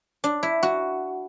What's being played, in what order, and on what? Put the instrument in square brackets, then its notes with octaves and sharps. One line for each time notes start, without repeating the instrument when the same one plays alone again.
[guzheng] D4
E4
F#4